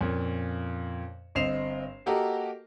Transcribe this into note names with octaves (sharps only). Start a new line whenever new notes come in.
F2 A#2 C#4
G1 C4 D#5 C7 E7 F7
A#3 F#4 G4 A4 A#4 D#5